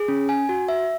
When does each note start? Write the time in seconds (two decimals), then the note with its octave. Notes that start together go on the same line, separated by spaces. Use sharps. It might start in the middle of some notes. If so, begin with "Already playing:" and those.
Already playing: G#4
0.08 C#4
0.29 G#5
0.49 F#4
0.69 E5